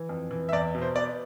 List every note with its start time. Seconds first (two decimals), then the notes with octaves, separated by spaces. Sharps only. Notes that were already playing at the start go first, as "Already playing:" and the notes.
Already playing: E3
0.09 F2
0.31 E3
0.49 E5
0.53 E2 D5
0.75 B2
0.82 C5
0.96 B3 D5